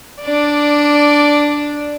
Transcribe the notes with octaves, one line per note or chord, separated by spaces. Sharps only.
D4 D5